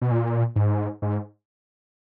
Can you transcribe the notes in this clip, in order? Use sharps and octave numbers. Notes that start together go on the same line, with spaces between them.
B2
A#2
G#2
G#2